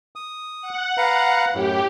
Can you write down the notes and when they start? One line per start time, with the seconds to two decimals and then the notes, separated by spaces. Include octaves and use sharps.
0.16 D#6
0.62 F#5
0.98 B4 F5 A#5
1.54 F#2 A2 G4